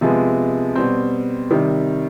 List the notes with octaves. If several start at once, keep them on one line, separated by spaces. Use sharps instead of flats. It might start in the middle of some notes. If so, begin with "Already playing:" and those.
C3 F3 G#3 B3
B2 G3 C4
C3 D#3 G3